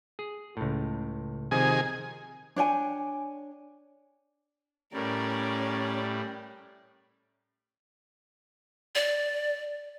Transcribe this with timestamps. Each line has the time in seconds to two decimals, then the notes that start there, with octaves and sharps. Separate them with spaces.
0.19 G#4
0.57 C#2 A2
1.51 C3 D#3 F3 G#4 G#5
2.56 D4 C#5 G5 G#5
4.93 A2 G3 C#4 A#4 D5
8.95 D5